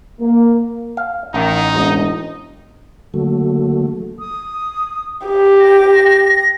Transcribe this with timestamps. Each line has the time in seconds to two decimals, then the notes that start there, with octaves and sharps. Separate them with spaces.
0.19 A#3
0.97 F5
1.34 A1 D#3 D#4
1.73 E1 D#5
3.14 D3 F#3 A3 A#3 F#4 A4
4.19 D#6
5.27 G4
5.61 A#6